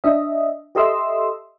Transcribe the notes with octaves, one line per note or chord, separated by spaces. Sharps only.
D4 D#5 E5
G4 A4 D#5 E5 C6 E6